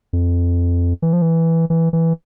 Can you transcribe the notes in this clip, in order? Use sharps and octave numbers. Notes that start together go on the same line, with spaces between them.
F2
E3
F3
E3
E3
E3